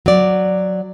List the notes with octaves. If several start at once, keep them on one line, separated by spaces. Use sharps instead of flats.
F#3 D5